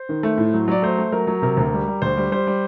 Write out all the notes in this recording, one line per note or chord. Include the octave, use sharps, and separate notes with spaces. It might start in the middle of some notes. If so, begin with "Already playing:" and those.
Already playing: C5
D#3
A3
A2
F#3
F#3 D5
A3 C5
A3
F#3 A#4
F#3
C3 A#4
D2
G3
G3
D2 C5
G3
G3 C5
G3